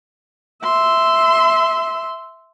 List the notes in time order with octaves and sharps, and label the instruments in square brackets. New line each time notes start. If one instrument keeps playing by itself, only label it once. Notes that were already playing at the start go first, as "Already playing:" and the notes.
[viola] E5 C6